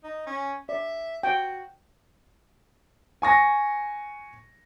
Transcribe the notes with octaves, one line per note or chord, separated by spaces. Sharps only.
D#4
C#4
D5 E5
F#4 G5
G#5 C#6 A#6